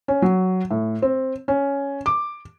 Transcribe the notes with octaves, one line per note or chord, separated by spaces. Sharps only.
C#4
F#3
A2
C4
C#4
D6